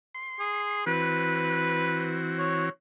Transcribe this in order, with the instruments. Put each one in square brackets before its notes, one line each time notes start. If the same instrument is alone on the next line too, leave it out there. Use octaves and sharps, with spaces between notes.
[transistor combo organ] C6
[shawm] G#4
[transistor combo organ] E3 C4 F#4 [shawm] B4
[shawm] C#5